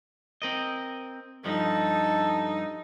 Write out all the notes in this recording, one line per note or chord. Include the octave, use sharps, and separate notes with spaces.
C4 A#4 D#5
G2 F3 D#4 A4